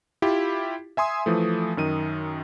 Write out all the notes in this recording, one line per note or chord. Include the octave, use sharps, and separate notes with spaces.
E4 F4 G4
E5 G#5 C6 D#6
E3 F3 A3
F#2 D#3 D#7